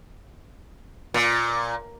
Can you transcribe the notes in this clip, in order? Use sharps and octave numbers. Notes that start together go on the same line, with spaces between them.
A#2